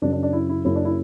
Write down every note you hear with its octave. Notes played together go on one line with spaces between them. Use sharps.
F#2 C#3 F#3 D4
D4
D4
E4
E4
F#1 F#2 C#3 E4
D4
E4